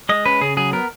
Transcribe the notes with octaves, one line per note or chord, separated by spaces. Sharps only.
G#3 D#5
C#4 B4
C#3 G#4
F#3 G#4
B3 A#4